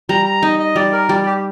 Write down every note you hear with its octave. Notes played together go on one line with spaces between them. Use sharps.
G3 A#5
A#5
D#4 D#5
D#5
G3 D5
A#4
G3 D5
G4